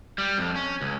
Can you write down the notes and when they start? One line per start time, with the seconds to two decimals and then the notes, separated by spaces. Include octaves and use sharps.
0.18 G3
0.38 F2
0.56 C#4
0.81 C#2